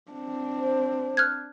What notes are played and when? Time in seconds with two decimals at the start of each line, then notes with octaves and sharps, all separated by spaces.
0.12 C4 D4
0.58 C5
1.17 F6 F#6 G#6